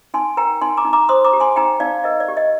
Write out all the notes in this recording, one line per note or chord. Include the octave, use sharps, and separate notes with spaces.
D#4 G#5 C6
A#4 G5 A#5
D#4 G#5 C6
A#5 D6
D#4
A#5 D6
C5 C6 D#6
A#5 D6
G4
G#5 C6
D#4 G5 A#5
D#4 D5 F5
A#4 D#5
D5
G4
D#5